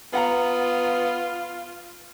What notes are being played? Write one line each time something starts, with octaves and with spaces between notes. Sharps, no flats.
B3 F4 F5 F#5 A#5